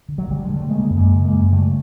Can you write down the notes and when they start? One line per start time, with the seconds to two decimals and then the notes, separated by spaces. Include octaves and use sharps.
0.08 D3
0.18 F#3
0.29 D3 G3
0.45 D3 G#3
0.56 A3
0.69 C#3 G#3 A#3
0.90 F#2
0.97 G#3 A#3
1.11 C#3
1.24 G#3 A#3
1.32 F#2
1.52 C#3 G3 A3